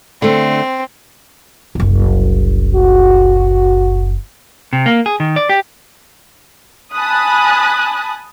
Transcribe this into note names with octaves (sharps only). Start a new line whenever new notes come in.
D3 A3 C4
F#1 C2
F#4
C3
A#3
G#4
D#3
D5
G4
G#5 A5 B5 D#6 F#6